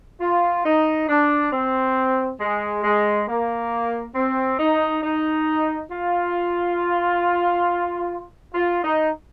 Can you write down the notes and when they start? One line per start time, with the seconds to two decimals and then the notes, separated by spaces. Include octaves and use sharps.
0.21 F4
0.65 D#4
1.09 D4
1.53 C4
2.41 G#3
2.84 G#3
3.28 A#3
4.15 C4
4.59 D#4
5.03 D#4
5.90 F4
8.54 F4
8.83 D#4